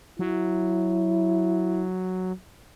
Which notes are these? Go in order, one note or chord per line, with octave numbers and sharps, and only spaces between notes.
F#3 E4